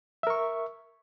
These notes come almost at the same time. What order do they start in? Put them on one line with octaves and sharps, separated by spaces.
E5 A#4 C#6